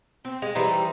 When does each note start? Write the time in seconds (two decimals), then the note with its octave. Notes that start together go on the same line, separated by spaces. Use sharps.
0.25 C4
0.42 G#3
0.55 E3 G3 C4 D#4